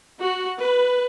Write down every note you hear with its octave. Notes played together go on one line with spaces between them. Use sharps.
F#4
B4